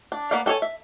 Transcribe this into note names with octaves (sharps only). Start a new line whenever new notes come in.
D4
A#3 B3 D5 F5
D4 A4 A#4 C#5 G#5
E5